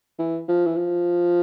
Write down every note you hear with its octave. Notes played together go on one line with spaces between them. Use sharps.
E3
F3
E3
F3